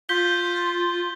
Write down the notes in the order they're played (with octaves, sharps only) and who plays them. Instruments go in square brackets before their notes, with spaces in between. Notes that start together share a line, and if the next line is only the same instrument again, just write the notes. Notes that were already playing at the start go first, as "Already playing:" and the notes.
[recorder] F4 [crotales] G6 B6 G7